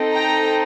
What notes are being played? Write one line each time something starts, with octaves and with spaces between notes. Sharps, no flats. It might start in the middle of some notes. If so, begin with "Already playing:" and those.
Already playing: C4 D#4 A4
G5 A#5